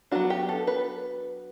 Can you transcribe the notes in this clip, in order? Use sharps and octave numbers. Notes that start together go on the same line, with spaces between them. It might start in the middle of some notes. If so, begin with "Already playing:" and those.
F#3 B3 D4 F#4
G4
A4
B4